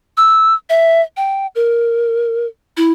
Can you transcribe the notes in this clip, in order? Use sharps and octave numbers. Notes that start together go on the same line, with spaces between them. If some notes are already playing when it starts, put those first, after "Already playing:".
E6
E5
G5
A#4
E4